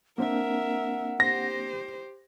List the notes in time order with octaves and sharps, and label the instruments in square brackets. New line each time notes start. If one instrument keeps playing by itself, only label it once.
[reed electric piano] A#3 C4 D4 [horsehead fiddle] A#4 E5 [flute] F#5
[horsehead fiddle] G4 C5 [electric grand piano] A#6